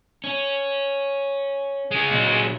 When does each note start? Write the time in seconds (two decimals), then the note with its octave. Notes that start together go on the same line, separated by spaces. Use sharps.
0.24 C#4
1.91 G#3 C#4
2.11 A#2 F#3